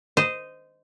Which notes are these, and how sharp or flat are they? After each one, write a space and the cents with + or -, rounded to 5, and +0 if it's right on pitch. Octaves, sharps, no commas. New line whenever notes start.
C5 -20 D#5 +0